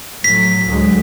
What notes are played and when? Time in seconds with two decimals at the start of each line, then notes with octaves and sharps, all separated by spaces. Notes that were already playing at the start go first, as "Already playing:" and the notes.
0.24 A2 F#3 B6
0.67 D2 F#3 G#3